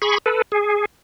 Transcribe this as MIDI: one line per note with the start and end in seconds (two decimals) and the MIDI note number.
0.02 0.18 68
0.02 0.18 83
0.02 0.18 85
0.26 0.42 69
0.26 0.42 71
0.52 0.85 68